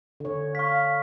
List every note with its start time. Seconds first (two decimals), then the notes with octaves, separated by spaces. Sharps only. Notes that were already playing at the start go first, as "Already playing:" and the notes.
0.20 D3 C#5
0.55 F5 C#6 B6